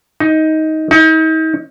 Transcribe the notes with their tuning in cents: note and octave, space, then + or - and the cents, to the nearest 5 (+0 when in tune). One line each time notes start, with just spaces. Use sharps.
D#4 +15
D#4 +40